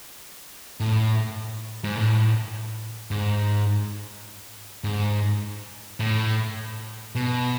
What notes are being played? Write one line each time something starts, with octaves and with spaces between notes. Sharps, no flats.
A2
G#2
A2
G#2
G#2
A2
B2